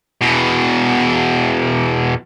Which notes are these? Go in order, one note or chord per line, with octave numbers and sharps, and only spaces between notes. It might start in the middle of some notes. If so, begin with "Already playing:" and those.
E2 B2